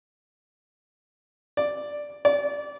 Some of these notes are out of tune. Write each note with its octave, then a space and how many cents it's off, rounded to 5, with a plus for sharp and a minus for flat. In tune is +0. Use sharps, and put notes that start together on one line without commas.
D5 +0
D5 -25